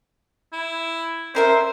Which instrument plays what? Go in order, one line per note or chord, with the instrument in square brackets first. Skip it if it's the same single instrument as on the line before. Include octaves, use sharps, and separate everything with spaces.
[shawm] E4
[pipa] C#4 A#4 E5 [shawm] C5